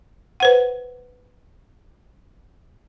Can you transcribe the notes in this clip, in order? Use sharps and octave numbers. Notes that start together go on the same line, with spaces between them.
B4 C5 F#5